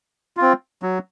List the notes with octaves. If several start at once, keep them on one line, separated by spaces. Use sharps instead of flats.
C4 F4
F#3